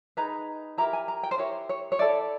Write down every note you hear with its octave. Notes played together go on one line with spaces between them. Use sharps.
D#4 G#4 B4 A#5
E4 G4 A#4 A#5
G#5
A#5
G5
C5
E4 G4 A#4 C#5
C#5
C#5
E4 A4 D5